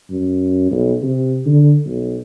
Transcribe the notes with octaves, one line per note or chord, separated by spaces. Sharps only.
F#2
B1
C3
D3
B1